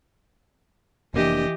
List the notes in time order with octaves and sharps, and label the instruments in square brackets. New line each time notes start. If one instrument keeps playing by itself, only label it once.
[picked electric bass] F1 A#3 D4 [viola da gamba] E3 G4 D#5